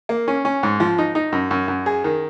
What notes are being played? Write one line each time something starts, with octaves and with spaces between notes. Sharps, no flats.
A#3
C#4
C#4
G#2
F3
D#4
D#4
F#2
F#2
F#2
G#4
D#3